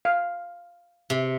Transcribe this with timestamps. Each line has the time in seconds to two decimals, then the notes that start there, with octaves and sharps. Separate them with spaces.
0.05 F5
1.10 C3